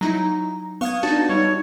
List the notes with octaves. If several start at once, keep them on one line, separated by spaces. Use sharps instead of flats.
F#3 D#4 E4 A#5
B3 F5 C#6 D#6 G#6
D4 D#4 F#4 A5
G3 D#4 C#5